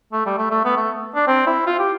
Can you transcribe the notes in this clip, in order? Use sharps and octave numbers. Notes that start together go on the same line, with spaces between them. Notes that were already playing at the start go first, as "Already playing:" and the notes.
A3
G3
A3
A3
B3
A3
D4
C4
E4
F4
G4